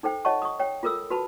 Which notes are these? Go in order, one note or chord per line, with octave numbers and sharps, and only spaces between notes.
D#4 A4 C5 G5
C#5 D#5 F#5 A5 C#6
C#6 D#6
C#5 G5
F4 A4 A#4 D#6 E6
F#4 B4 A5 B5